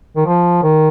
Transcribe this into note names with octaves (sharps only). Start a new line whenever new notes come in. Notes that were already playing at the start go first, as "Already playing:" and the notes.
D#3
F3
D#3